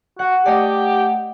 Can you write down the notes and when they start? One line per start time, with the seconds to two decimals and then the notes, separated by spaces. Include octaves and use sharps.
0.19 F#4 F#5
0.46 A3 G4 D5 D#5 F#5